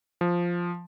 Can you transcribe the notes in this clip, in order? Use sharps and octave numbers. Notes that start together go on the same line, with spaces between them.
F3